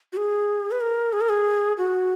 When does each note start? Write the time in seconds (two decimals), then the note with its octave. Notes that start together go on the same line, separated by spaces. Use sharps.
0.13 F#4
0.17 G#4
0.71 B4
0.81 A#4
1.13 G#4
1.21 A#4
1.29 G#4
1.78 F#4